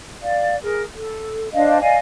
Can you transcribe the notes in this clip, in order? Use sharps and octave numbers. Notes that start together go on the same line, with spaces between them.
D5 F5
G#4 A#4
A4
D4 C5 D#5 F5
D5 D#5 F5 G#5